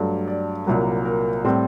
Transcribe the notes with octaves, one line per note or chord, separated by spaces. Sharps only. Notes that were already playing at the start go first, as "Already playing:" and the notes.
Already playing: G2 F#3 A3
D5
C2 A#2 F#3 A#3
A#4
A2 G3 C4